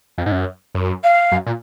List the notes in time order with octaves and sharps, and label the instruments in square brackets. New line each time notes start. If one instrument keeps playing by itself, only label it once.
[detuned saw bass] F2
G#2
F#2
F#2
[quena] F5
[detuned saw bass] F#2
A#2